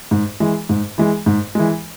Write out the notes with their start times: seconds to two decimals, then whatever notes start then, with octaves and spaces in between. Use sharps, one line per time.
0.11 G#2
0.40 E3 G#3
0.69 G#2
0.98 E3 G#3
1.26 G#2
1.55 E3 G#3